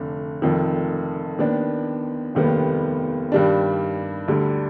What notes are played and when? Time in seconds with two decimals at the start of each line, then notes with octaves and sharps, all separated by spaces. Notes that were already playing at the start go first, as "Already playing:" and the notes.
Already playing: F1 D3
0.42 F1 F2 D#3
1.38 D#2 D#3 B3 D4
2.35 F1 D#2 D#3 G3 B3
3.32 G2 D#3 G3 D4
4.28 D2 D3 G3